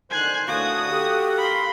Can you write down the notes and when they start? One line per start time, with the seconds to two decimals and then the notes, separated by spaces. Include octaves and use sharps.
0.10 G#2 D3 D#3 C5 G#5 F#6
0.48 A2 D3 F#4 F5 D#6
0.89 G4 A4
1.38 A#4 B5 C6